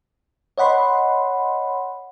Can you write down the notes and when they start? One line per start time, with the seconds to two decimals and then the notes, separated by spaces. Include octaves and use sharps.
0.58 C#5 D#5 F#5 B5 C6